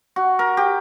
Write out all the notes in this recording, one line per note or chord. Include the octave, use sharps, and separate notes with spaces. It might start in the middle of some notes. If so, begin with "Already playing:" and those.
F#4
A#4
G4